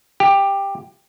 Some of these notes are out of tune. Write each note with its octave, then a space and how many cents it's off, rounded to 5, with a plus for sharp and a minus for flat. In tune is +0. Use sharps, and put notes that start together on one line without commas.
G4 +10